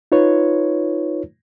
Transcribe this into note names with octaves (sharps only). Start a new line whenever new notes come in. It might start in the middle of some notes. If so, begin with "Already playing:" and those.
D#4 F4 B4 C#5